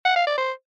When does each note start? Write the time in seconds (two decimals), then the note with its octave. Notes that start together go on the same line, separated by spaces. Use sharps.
0.05 F#5
0.16 F5
0.27 D5
0.38 C5